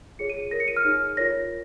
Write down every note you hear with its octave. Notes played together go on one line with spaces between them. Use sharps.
F4 G#4 C#5 C#7
D#7
F4 A#4 C#5 A#6
C#7
D#7
F6
D#4 G#4 C#5
F4 A#4 C#5 A#6